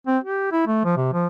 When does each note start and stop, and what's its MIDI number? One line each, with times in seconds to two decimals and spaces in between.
0.07 0.18 60
0.24 0.50 67
0.52 0.66 64
0.67 0.84 57
0.84 0.96 53
0.96 1.09 48
1.13 1.27 53